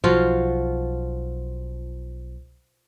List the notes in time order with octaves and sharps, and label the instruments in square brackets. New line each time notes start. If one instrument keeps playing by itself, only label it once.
[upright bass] B1 [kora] F3 F4 F#4